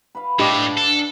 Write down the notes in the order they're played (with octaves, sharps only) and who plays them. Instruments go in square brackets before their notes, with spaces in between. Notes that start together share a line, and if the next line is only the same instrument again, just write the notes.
[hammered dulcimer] B4 F5
[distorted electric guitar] A2 [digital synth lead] D4 [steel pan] G4 D#5 D6
[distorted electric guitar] A4